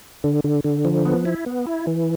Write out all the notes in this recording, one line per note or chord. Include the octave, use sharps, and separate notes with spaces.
D3
D3
D3
F3
B3
E4
B3
E4
E3